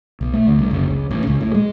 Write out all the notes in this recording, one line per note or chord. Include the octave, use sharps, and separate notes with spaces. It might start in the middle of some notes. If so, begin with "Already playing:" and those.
B1
A3
D2
C2
F#1
C#2
A1
C#2
A2
G#3